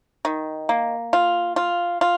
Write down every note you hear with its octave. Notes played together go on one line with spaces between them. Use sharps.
D#3
A#3
F4
F4
F4